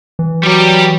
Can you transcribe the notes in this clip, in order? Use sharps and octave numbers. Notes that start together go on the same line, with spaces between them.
E3
F#3 G3 G4